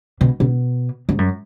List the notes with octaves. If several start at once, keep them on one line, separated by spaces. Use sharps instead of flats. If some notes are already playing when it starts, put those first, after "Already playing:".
B2
B2
G#2
F#2